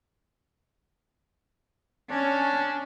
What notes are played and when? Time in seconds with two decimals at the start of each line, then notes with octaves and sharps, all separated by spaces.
2.10 C#4 D4